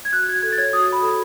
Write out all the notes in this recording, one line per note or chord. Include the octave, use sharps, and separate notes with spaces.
G#6
F#4 F#6
F#4 G#6
A4 G#6
A6
C#5 G#6
F#4 D#6
F#4 B5
A4